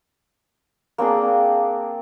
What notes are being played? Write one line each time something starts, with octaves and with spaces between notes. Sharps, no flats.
A#3 C4 D4 G#4